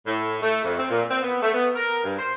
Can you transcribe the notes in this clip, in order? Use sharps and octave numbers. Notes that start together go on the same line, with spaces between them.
A2
A3
F2
C4
A#2
C4
B3
A3
B3
A#4
G2
C5